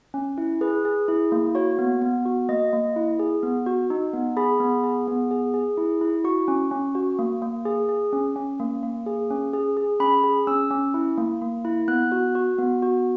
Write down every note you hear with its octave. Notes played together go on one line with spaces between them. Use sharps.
C#4
E4
G#4 B4
G#4
E4
A#3
F#4 C#5
B3
B3
F#4
A#3 D#5
A#3
E4
G#4
B3
F#4
D#4
B3
G#4 B5
B3
G#4
B3
G#4
G#4
E4
E4
F#4 C#6
C#4
C#4
F#4
A#3
A#3
G#4
G#4
C#4
C#4
A#3
A#3
G#4
C#4
G#4
G#4
C#4 B5
G#4
C#4 E6
C#4
E4
A#3
A#3
E4
B3 F#6
F#4
F#4
B3
F#4